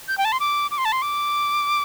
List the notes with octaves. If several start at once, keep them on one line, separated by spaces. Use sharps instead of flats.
G6
G5
A5
C6
D6
D6
C6
A5
C6
D6